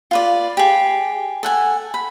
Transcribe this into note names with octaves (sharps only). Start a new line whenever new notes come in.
F4 B4 D5
G4 G#4
A4 F#5 G#5
B5